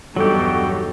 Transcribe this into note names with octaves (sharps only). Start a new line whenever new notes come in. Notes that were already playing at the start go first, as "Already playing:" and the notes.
E2 G2 B2 F#3 D#4 F#4 G4 A4